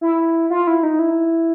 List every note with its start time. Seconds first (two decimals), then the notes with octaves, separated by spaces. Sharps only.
0.01 E4
0.50 F4
0.67 E4
0.83 D#4
0.99 E4